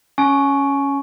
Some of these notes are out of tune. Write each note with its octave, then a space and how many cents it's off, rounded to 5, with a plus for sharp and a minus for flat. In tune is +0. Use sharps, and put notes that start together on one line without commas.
C#4 +0 G#5 +30 C#6 +0